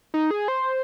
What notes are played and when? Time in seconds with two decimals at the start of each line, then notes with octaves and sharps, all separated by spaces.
0.14 D#4
0.31 G#4
0.48 C5